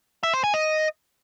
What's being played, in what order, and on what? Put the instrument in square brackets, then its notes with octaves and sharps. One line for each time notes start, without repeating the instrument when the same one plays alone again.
[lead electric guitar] E5
C5
G#5
D#5